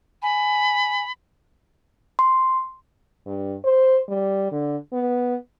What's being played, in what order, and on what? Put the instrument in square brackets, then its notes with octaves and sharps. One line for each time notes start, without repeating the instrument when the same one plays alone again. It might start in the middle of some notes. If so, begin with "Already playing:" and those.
[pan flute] G#5 [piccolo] B5
[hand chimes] C6
[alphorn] G2
C5
G3
D3
B3